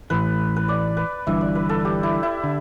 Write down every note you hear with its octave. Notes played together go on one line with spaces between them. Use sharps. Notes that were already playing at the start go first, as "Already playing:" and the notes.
A1 A2 E3 B4
B4
D5
B4
G1 G2 E3 E5
D5
B4
A4
G4
E4
E4
D3